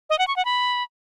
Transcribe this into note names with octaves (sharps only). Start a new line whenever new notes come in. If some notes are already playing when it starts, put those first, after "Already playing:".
D#5
F#5
C#6
F#5
B5